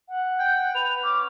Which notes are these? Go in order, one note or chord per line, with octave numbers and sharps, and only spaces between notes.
F#5
G5
B4 F7
C#4 D6